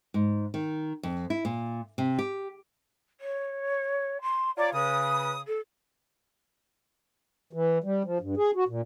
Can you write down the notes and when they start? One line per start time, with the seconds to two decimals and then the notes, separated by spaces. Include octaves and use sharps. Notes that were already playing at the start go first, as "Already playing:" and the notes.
0.14 G#2
0.54 D#3
1.03 F2
1.30 E4
1.45 A#2
1.98 C3
2.19 G4
3.21 C#5
4.22 C6
4.57 F4 C#5 D5 A#5
4.73 C#3 B4 D#6
5.47 A4
7.53 E3
7.84 G3
8.05 F3
8.21 G2
8.37 G#4
8.56 F#4
8.68 A#2